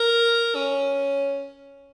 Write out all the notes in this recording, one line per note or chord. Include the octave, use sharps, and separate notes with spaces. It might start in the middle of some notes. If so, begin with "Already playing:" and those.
Already playing: A#4
C#4